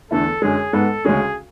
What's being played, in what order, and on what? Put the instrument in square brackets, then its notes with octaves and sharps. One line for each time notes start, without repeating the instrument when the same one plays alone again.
[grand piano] E2 D3 A3 E4 [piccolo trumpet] A4
[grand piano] F#2 D3 G#3 [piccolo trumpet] G#4
[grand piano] G#2 G#3 B3 [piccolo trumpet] A4
[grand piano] D2 C#3 G#3 C#4 [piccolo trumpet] G#4